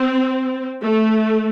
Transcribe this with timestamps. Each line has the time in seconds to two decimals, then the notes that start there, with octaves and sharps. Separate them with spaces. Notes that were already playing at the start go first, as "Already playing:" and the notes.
Already playing: C4
0.82 A3